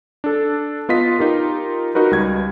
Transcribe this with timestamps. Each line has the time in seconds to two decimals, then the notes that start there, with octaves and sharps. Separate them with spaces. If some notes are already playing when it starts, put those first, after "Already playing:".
0.24 D4 A4
0.89 B3 F4 D#5 B6
1.19 D#4 F4 G4 A#4
1.95 D#4 F#4 A#4 B4
2.11 C#2 G3 G#6